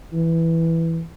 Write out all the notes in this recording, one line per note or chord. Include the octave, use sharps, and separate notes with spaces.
E3